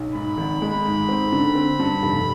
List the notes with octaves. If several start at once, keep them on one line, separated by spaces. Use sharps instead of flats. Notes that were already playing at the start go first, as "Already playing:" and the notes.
Already playing: B1
G#2 B5
G#1
G#3
G#2
C4
D3
C4
G2
F1